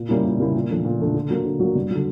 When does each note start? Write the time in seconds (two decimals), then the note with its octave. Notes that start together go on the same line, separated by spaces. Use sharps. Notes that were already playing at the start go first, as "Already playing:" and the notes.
Already playing: A#2
0.09 G3 A#3 C#4 E4
0.25 A#2
0.40 G3 A#3 C#4 E4
0.55 A#2
0.70 F3 A3 D4
0.85 A#2
0.99 F3 A3 D4
1.14 D3
1.30 F#3 A#3
1.45 D3
1.60 F#3 A#3
1.75 G2
1.91 D3 F#3